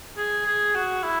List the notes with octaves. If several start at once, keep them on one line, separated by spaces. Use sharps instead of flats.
G#4
G#4
F#4
E4